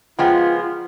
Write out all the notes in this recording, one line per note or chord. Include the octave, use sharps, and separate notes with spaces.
F3 G#3 B3 F4 G5 A#5